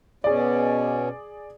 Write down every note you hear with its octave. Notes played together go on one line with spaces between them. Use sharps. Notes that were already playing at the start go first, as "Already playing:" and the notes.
B2 C#4 G#4 D5